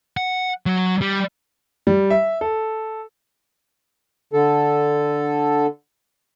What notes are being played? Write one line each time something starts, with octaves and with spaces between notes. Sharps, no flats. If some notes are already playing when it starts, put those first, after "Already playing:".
F#5
F#3
G3
G3
E5
A4
D3 A4